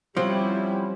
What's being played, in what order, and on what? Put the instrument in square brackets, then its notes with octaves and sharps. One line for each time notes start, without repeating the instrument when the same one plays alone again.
[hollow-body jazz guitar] F3 [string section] G3 E4 [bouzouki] C4 C#4 F#5